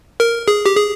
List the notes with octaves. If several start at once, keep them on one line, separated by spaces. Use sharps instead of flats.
A#4
G#4
G4
G#4